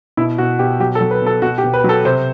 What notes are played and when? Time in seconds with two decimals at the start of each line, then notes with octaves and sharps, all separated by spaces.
0.17 B2 E4
0.38 B2 F#4
0.59 B2 G4
0.80 F#3 G4
0.95 A4
1.01 F#3
1.11 B4
1.22 B2 A4
1.42 B2 F#4
1.58 G4
1.64 B2
1.74 B4
1.84 F#3 A4
2.05 C3 C5